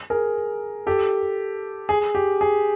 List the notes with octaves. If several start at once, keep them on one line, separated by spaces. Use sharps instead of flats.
G#4 A#4
G4 A4
G#4
G4
G#4